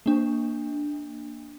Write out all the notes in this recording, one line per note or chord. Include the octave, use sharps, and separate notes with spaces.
A#3 D4